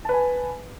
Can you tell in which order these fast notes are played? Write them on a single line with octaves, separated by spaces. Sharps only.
A5 B4 G#5